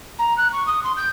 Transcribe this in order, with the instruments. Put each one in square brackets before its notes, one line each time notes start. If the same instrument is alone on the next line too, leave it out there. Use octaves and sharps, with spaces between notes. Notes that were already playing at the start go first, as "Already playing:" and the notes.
[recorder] A#5
F#6
C#6
D#6
C6
G6